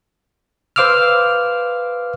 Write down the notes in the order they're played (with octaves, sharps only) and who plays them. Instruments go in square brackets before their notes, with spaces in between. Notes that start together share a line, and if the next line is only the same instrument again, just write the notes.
[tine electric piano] B4 C5 F5 D6 E6 F6